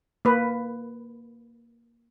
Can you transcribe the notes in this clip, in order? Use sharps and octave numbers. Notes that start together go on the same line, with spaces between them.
A#3 B4